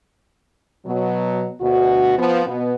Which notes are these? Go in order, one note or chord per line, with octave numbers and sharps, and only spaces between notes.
B2 F#3
D2 B2 F#4
F3 B3
B2 B3